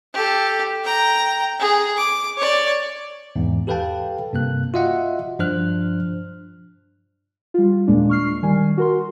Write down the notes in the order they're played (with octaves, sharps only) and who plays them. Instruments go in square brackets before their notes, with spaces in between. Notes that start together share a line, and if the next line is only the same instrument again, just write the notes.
[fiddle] G4 A4
G5 A#5
G#4
D6
C#5 D5
[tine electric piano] E2 G#2
G4 A4 B4 F5 G5 A5
G2 C3 A#3 F#6
F4 F#4 D#5 E5 F#5
G2 F3 D4 C5 F6 F#6
[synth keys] G3 F4
D#2 A#2 G#3 A#3 D4
C#6 F6 C7
D#3 G3 G#5
F#4 A#4 C6